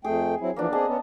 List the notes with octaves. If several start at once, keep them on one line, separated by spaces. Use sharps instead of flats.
F2 A3 G#4 G5
F#3 C4 E4
E3 F3 A#3 B3 D4
C4 G#4 D#5 A5
B3 C#4